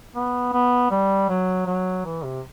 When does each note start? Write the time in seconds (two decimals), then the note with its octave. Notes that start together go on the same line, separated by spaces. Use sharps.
0.15 B3
0.53 B3
0.91 G3
1.29 F#3
1.67 F#3
2.05 E3
2.24 C3